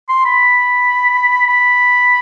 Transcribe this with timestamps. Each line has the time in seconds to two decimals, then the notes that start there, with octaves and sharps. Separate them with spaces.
0.09 C6
0.25 B5
1.47 B5